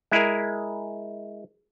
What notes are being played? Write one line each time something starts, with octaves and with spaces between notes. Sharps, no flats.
G#3 E4 G#4 A#4